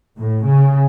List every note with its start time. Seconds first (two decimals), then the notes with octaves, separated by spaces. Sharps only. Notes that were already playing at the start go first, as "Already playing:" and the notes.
0.18 A2
0.45 C#3